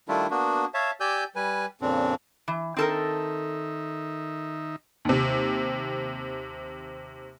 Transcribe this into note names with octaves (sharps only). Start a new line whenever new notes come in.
D#3 G3 A3 D4 E4 F4
A#3 B3 D4 F#4
C#5 E5 F5 A5
G4 D5 G#5 E6 G6
G3 B4 G#5
F2 A#2 C#3 C4 D4
E3
D#3 C4 D#4 A4 A#4 E5
D#2 C3